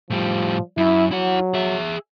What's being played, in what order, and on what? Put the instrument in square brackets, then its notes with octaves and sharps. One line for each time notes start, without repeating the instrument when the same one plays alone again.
[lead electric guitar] A2 G3 [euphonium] F3
[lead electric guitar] F#2 [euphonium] E4
[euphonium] F#3 [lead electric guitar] E4 F#5
[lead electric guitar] G#4 E5